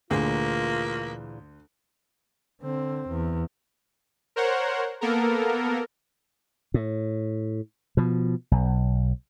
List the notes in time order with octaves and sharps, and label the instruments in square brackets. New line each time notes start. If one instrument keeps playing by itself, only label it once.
[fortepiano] D2 [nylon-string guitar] A#2 E3 G#4 [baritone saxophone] A#3 [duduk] F4
[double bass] D3 C4
E2
[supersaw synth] A#4 C5 C#5 F#5
A#3 B3 A4 A#4
[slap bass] A2
B2 F3
B1